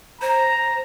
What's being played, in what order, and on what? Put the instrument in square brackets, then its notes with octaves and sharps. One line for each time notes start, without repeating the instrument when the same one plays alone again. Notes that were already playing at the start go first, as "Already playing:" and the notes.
[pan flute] C5 [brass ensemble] A#5